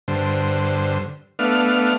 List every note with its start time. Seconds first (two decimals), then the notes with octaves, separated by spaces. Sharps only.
0.08 G2 D3 C5
1.39 A3 B3 D4 F5 F6